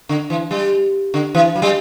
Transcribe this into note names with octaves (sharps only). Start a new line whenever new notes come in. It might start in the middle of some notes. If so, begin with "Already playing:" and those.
D3
E3
G3
D3
E3
F#3
G3